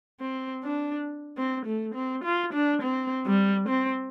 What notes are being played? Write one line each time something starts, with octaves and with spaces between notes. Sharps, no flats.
C4
D4
C4
A3
C4
F4
D4
C4
G3
C4